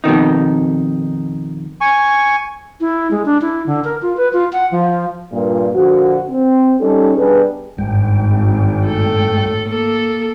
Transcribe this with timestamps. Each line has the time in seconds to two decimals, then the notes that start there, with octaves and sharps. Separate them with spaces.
0.04 F2 B2 D#3 D#4
1.81 G#5 C#6
2.80 E4
3.11 G#3
3.26 D4
3.41 E4
3.66 D3
3.84 A#4
4.02 F4
4.17 B4
4.33 F4
4.53 F#5
4.71 F3
5.32 G2 A#2
5.73 A#2 D3 F3 F#4
6.29 C4
6.80 G3 C#4 D#4 G4 A4
7.17 B2 G3 B3 D4 G#4 B4
7.78 G#1 G2 G#3 G5
8.87 A2 A4
9.69 A#3 A4